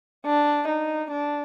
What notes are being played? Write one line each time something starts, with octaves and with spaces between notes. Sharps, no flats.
D4
D#4
D4